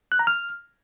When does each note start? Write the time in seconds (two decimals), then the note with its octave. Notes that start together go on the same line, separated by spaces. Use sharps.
0.12 F#6
0.19 A#5
0.27 F6